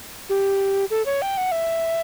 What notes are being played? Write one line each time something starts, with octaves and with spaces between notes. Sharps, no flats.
G4
A4
C#5
G5
F#5
E5